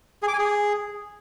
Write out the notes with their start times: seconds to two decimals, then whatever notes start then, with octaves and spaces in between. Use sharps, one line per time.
0.23 G#4
0.28 D6
0.33 G#5
0.38 G#4